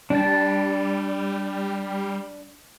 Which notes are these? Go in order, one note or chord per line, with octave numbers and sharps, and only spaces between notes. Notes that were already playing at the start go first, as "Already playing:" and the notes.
G3 D4 A5